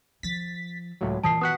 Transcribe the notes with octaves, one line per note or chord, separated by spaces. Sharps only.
F3 A6 B6
C#2 A2 F#3
A#2 E3 F4 A5 D#6 C7
B3 F#4 F#5 D#6 F#6 B6